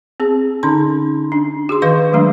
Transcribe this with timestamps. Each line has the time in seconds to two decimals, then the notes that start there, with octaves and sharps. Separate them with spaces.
0.20 C4 G#4
0.63 D3 C#4 D#4 C6
1.32 D4
1.69 F#4 G#4 C6
1.82 D#3 B4 D#5 F5 C#6
2.12 D#3 F#3 G#3 A3 D4